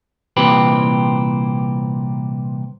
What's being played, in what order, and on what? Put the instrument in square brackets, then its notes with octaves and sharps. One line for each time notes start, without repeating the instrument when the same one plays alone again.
[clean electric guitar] C2 A#2 E3 C4 G4 B4